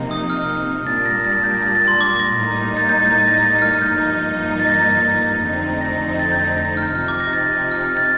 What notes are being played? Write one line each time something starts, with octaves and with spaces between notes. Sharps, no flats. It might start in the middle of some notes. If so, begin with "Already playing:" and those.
Already playing: C3 F3 A#3 D#4
D#6
F6
A#2 G3 A#3 D4 A6
A#6
A6
G6
A#6
A6
A6
C6
D6
A#6
A2 G3 A#3 D#4
A6
G6
A6
A6
A#6
A6
F6
G6
G2 F3 A#3 D#4
A6
A#6
A6
A6
F2 D3 A3 C4 D#4
A#6
A6
G6
G6
A#6
F6
G6
C3 F3 C4 D#4 F6
D6
A#6
A6
F6
A6